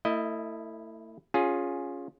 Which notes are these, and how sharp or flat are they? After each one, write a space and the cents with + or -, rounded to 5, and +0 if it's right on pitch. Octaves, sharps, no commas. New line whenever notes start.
A3 +35 E4 +0 D#5 +0
C#4 +0 F4 +15 G#4 +0